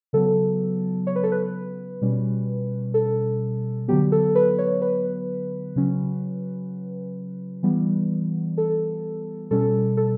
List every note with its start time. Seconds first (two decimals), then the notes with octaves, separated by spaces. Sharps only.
0.13 C#3 F#3 B3 A4
1.07 C#5
1.16 B4
1.23 A4
1.32 B4
2.02 B2 G3 C#4
2.94 A4
3.88 D3 F#3 B3 G4
4.12 A4
4.35 B4
4.58 C#5
4.82 B4
5.76 C#3 F#3 C#4
7.63 E3 G3 B3
8.58 A4
9.51 B2 G3 C#4 A4
9.97 A4